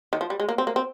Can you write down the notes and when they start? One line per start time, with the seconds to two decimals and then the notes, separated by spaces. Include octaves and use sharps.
0.13 D#3
0.21 F3
0.30 G3
0.40 G#3
0.49 A#3
0.58 C4
0.67 A#3
0.76 C4